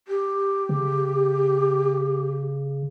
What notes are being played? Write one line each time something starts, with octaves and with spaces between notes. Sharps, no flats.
G4
C#3